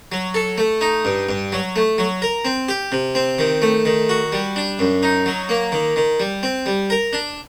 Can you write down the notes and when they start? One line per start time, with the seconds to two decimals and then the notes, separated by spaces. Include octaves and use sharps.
0.12 F#3
0.34 A4
0.58 A3
0.81 D#4
1.05 G2
1.29 G2
1.52 F#3
1.76 A3
1.98 F#3
2.22 A#4
2.45 C4
2.68 G4
2.92 C3
3.15 C4
3.39 D#3
3.62 A3
3.85 D#3
4.09 F#4
4.32 G3
4.56 D4
4.79 F#2
5.03 D#4
5.26 F#3
5.49 A#3
5.72 D#3
5.96 D#3
6.20 G3
6.43 C4
6.66 G3
6.90 A#4
7.13 D4